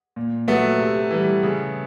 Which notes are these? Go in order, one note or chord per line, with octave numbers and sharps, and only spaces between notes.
A#2
F#3 A3 B3
C3
E3 G3
C#3